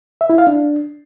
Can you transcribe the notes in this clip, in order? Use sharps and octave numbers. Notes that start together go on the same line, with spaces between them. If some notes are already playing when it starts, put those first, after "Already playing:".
E5
E4
F5
D4